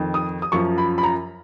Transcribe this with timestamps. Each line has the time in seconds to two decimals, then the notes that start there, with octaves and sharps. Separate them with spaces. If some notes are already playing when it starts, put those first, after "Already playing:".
Already playing: F2 D#3
0.14 D#6
0.42 D#6
0.52 F#2 F3 C#6
0.78 B5
0.98 B5
1.03 A#5